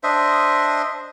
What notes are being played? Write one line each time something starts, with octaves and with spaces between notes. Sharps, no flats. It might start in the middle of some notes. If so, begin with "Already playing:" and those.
D4 C5 D#5 E5